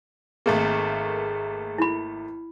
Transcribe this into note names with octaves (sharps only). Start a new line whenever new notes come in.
G#1 A3 A#3 G#4
E4 B5